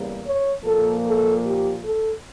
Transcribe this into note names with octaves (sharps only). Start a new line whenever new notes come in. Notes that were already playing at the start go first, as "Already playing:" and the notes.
Already playing: E2 C#3 G3 A#3
C#5
A#2 F3 A#3 A4
A4
G4
A4